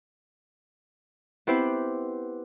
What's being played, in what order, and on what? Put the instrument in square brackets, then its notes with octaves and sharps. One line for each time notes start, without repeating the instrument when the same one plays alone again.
[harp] B3 C4 E4 G4 B4 C5